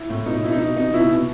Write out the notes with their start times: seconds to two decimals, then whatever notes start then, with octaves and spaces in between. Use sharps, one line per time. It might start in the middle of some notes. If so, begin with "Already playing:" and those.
Already playing: E4
0.10 A2
0.26 B2 D#4
0.43 B2 E4
0.52 D#4
0.60 B2
0.76 B2 D#4
0.93 B2 E4
1.10 B2